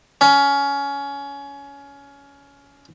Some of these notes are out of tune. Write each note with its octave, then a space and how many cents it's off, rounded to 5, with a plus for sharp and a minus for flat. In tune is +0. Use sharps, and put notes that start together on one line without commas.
C#4 +20